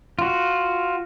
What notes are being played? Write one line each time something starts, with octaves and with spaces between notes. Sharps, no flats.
F4 F#4